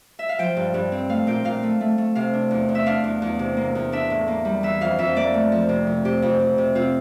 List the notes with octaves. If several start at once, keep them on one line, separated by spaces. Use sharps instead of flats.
E5
F5
F3 G5
G2
G2
C4
A3 F5
A#2 G5
A#2 F5
A3
A3
A3
C3 F5
D4
E2
E2
E5
D4 F5
E2
E2
C3
A#3
E2
D4 E5
A2
A#3
G3
E3 E5
F2 F5
F2 E5
A#3 D5
A3
F3
C3
F3
C3 G4
F2
F2
C3
C4 F4